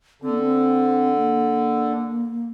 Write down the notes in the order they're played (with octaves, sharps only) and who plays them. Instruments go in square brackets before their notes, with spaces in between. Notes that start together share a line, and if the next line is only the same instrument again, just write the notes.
[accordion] D3 [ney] C4
[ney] A#3
C4
A#3